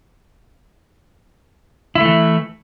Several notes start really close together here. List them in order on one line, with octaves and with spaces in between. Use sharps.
E4 A3 E3